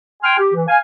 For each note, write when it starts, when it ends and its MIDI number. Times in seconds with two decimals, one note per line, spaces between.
0.23 0.34 79
0.23 0.34 80
0.23 0.34 84
0.23 0.34 89
0.37 0.53 67
0.53 0.62 52
0.68 0.78 77
0.68 0.78 80